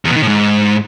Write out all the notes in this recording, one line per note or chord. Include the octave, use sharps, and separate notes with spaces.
E2
B2
D#3
A2
G#2